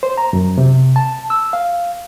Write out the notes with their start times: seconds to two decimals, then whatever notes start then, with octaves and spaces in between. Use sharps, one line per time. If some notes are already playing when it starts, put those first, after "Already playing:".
0.03 C5
0.18 A#5
0.33 F#2
0.58 C3
0.96 A5
1.30 E6
1.53 F5